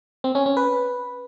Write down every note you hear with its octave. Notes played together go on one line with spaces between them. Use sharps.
C4
C#4
C#4
B4